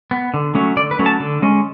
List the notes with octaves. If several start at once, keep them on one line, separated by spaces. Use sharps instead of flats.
B3
D3
F#3 A3 C#4
D3 D5
B4
F#3 A3 C#4
A5
D3
G#3 C#4